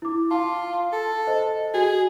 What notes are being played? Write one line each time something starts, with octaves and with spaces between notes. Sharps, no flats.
E4 D6
F4 A5
A4
C5 D#5
F#4 G#4